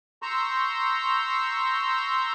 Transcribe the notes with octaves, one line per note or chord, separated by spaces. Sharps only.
A#5 C6 C#6 E6 G6